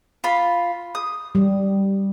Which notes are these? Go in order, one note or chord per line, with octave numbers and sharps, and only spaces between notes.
F4 B5
D#6
G3